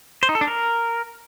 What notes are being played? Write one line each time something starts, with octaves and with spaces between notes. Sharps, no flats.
C5
D#4
A4
D4
A#4